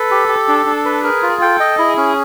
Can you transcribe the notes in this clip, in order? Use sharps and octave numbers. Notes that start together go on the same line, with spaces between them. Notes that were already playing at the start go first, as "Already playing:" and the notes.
Already playing: A4 B4
G4
G4
D4
D4
B4
G#4 A#4
F4
A4 G5
D#5
E4 G#4
C#4